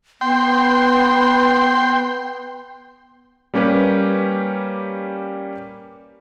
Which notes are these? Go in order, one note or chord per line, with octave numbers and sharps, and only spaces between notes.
B3 G5 C6
G3 A#3 C#4 G4 B4